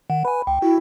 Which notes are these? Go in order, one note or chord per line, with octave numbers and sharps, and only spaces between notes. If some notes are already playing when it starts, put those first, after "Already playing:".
D#3 F#5
B4 G#5 B5
C#2 G5
E4 F#4